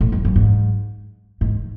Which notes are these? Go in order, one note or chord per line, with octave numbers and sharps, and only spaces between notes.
A2
F#2
F#2
G#2
G#2